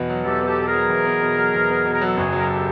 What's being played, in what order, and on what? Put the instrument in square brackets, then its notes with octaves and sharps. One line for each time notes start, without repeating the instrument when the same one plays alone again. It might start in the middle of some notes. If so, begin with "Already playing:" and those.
Already playing: [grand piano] E2 B2 B3
F#3
[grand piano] E2 [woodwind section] G4 A4
[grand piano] B3
[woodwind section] G4 A4
[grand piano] B2
[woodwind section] G#4 A#4
[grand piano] F#3
E2
B3
B2
F#3
E2
B3
B2
[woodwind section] A#4
[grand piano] F#3 [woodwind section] A4
[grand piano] F#1 [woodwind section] F#4 G#4
[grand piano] F#3
[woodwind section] A#4
G4 A4